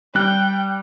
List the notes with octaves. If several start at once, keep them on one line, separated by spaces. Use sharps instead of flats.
G3 G5 F#6